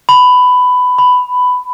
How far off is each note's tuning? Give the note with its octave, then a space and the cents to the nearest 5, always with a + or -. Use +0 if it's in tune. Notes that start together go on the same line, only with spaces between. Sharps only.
B5 +15
B5 +10